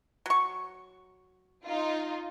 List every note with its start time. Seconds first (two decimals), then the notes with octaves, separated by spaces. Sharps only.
0.26 F#3 C#6
1.66 D#4 F4